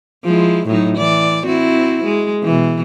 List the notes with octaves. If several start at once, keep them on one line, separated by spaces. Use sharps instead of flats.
F3 G#3 E4
A2 F#3 D#4
E3 D5
C4 E4 F#4
G#3
B2 E3